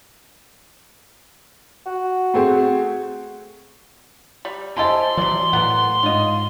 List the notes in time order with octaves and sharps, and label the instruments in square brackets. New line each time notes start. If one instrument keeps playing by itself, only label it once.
[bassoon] F#4
[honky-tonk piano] A3 C4 G#4
[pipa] G3
[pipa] E4 G4 A4 [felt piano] C5 D#5 G#5 [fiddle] C6
[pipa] C3 D5 [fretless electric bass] E3 F#3
[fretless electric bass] A2 [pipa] A#3 B3 F#5
[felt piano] G#2 [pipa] F4 D#5